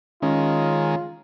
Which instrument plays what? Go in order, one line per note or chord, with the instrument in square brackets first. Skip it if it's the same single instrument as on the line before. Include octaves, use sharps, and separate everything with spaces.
[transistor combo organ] D#3 G#3 [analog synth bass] C#4 [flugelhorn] F4